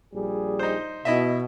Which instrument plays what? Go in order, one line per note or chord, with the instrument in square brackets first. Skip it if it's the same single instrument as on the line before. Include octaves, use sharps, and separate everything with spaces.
[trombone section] A#1 G3 G#4
[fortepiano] D#4 C5
[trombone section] B2 [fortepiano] E4 D#5 E5